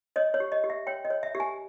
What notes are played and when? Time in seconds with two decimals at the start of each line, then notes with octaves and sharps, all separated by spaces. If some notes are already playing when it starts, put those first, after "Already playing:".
0.16 C#5 D#5
0.34 C#5
0.40 G4
0.52 D#5
0.64 G4
0.70 E5
0.87 C#5 G5
1.05 D#5
1.10 C#5
1.23 E5
1.35 G4
1.40 G#5